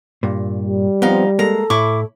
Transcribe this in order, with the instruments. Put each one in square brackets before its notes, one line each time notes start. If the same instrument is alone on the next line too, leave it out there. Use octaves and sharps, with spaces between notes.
[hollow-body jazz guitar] G2 A#2
[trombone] G3
[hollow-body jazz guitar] F3 B3 [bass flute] C4 [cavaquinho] D#4 F5
[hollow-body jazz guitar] G#3 A#3 [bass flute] A4 [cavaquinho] A#5
[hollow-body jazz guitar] A2 [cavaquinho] E4 C#6 D6